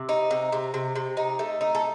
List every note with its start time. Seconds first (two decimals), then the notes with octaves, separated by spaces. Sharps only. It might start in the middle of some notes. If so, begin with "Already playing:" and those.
Already playing: C3
0.09 D#4
0.31 C3
0.52 C3
0.74 C3
0.95 C3
1.17 D#4
1.39 A3
1.61 D#4
1.75 A4